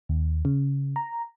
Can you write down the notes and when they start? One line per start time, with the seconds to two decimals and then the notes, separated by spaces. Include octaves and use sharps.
0.09 D#2
0.45 C#3
0.96 A#5